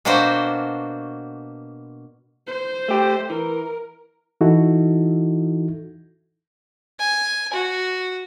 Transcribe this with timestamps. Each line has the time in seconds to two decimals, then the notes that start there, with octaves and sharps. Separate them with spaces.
0.05 B2 A#3 D4 F#4 C5 G5
2.47 C5
2.88 A3 G4
3.30 E3 A#4
4.41 E3 D#4 E4 F#4 A4
6.99 G#5
7.53 F#4